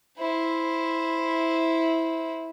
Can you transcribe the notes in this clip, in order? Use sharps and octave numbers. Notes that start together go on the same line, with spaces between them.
E4 C5